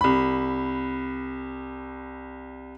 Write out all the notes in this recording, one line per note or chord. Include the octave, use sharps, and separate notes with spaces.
C2 B5